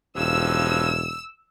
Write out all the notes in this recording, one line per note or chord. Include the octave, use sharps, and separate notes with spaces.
E1 G2 F3 C#4 E6